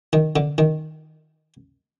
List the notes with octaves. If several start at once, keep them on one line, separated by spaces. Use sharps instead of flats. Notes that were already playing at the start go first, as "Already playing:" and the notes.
D#3
D3
D#3